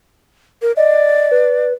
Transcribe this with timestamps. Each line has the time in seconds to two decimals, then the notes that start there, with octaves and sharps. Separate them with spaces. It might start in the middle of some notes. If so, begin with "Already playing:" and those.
0.62 A#4
0.77 D5 D#5
1.31 B4